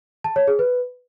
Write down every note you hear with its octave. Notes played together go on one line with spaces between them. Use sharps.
A5
C#5
G#4
B4